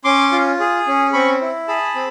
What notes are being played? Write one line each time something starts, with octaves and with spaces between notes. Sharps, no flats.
C#4 C6 D6
F4
G#4
C#4
C4 B5 C#6
E4
G#4 A5 B5
C4